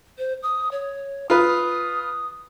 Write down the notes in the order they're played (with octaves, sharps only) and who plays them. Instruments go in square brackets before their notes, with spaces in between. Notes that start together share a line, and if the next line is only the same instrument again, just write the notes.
[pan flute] C5
D#6
C#5
[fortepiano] F4 B4 [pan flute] D#6